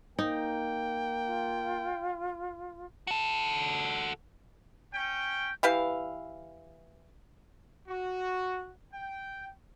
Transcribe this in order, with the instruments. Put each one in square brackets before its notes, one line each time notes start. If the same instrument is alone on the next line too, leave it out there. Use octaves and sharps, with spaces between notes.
[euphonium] A#3 [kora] D#4 [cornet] G5
[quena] F4
[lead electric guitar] F#4 A4
[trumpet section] C#4 G5
[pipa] E3 G4 B4 F5
[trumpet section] F#4
G5